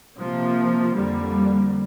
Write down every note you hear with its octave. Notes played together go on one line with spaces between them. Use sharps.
C3 F3 A#3
F2 D3 G3 A#3